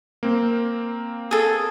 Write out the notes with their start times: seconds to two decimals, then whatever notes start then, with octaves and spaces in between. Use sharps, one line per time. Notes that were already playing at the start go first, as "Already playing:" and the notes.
0.23 A#3 C4
1.31 G#4 A4